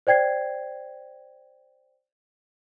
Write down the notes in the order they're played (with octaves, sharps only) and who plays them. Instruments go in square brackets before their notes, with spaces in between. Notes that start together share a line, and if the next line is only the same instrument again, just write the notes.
[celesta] C5 D5 G5 G#6 C7